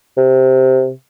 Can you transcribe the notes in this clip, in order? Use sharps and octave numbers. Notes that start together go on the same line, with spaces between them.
C3